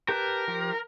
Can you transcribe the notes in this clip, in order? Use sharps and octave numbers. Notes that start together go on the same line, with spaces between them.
G4 A#4 B4 A5
F3 G4